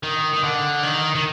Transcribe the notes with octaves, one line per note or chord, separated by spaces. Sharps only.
D#3
D#3
D3
D#3
D#3